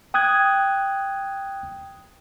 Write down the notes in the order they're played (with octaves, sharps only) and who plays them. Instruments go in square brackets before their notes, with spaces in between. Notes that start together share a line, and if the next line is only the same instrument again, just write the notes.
[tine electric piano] G5 D#6 F#6 G#6